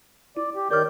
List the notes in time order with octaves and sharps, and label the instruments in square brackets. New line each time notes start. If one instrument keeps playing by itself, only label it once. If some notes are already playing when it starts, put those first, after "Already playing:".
[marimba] E4 [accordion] D5
[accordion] G4
[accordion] D#3 D5 G6 [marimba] A#4 C#5 F6